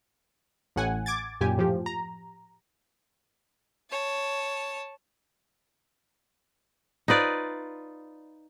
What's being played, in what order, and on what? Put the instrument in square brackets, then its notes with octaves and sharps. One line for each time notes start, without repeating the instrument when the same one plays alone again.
[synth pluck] A1 A2 F#5 G#5
D6 G#6 A6
F#2 A#2 G4 G#5
A2 F3 G4
A#5
[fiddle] C#5 A5
[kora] D#4 F4 B4 D5